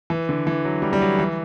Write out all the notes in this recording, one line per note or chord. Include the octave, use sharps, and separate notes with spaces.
E3
D3
E3
F#3
G3
G3
F#3
E3